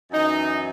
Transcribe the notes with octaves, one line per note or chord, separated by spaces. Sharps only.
F#2 E3 D#4